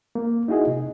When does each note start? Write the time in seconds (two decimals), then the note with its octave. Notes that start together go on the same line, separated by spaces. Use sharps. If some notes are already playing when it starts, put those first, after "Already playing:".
0.15 A#3
0.48 D#4 E4 F#4 G#4 D#5
0.67 C3